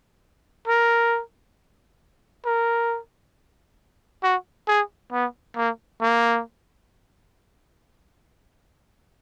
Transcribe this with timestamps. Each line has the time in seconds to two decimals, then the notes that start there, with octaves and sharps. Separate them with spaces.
0.68 A#4
2.45 A#4
4.23 F#4
4.68 G#4
5.12 B3
5.56 A#3
6.01 A#3